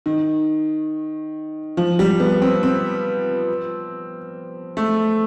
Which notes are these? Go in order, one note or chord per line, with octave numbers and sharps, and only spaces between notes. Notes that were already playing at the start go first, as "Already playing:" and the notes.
D#3
F3
G3
B3
C4
C4
A3